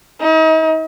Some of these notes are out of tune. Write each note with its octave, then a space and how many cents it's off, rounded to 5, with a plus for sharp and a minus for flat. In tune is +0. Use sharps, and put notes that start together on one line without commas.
D#4 +40